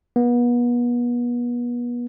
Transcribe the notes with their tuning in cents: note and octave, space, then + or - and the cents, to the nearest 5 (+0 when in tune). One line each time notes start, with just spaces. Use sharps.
B3 -35